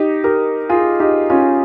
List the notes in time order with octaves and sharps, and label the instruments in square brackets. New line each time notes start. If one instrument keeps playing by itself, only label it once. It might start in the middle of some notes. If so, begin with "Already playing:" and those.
Already playing: [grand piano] D#4 G4
G4 A#4
F4 G#4
D#4 G4
C#4 F4